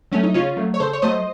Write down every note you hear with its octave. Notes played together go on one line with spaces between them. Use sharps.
F#3 A3 C#4
D#4
C#3 C#4 F4
F#3 A3
C#5
C#3 A4 C5
C#5
F#3 A3 C5 D#5